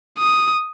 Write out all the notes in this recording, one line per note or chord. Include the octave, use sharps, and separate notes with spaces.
D#6